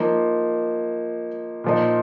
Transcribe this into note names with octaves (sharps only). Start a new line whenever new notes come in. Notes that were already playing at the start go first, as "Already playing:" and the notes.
Already playing: F3 A#3 D#4
A#2 F3 D#4